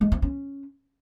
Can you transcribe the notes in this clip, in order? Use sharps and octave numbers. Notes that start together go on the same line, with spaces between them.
G#3
C4
C#4